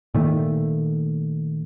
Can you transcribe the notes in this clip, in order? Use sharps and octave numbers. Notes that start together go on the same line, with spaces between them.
A#2 D#3 A3